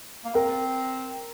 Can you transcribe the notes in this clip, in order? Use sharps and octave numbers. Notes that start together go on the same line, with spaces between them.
A#3
C4 A#4